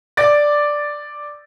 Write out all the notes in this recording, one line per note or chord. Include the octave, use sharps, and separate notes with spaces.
D5 D6 A6